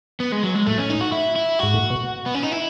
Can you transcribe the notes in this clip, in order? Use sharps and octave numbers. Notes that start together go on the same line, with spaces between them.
B3
G#3
F#3
G#3
A2 A3
C#4
D#4
F#4
E4
E4
G#2 F#4
A2
B2
B3
C#4
D#4
E4